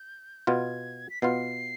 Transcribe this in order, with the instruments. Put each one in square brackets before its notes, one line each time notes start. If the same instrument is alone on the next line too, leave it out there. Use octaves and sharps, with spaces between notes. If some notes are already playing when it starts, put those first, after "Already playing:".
Already playing: [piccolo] G6
[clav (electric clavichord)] B2 B3 F4 [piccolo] G#6
[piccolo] B6
[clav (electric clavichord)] B2 B3 F4 [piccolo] C7